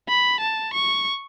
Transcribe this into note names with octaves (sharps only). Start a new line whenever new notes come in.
B5
A5
C#6